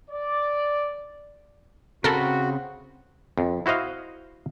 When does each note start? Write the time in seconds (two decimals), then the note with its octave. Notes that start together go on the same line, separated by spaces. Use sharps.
0.11 D5
2.04 C#3 C4 F#4 A4 A#4 B5
3.38 F2
3.66 E4 F#4 C5 D#5 F5